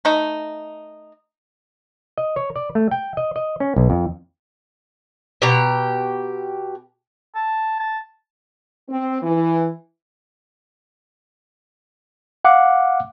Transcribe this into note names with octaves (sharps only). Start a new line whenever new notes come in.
A3 D#4
D#5
C#5
D5
A3
G5
D#5
D#5
C#4
B1
F2
B2 G4 A#5
A5
A5
C4
E3
F5 F#5 D6